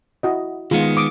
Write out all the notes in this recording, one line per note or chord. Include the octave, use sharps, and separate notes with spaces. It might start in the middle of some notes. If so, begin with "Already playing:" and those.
E4 F#4 D#5
D#3 G#3 B3 F4 G#4
D6 D#6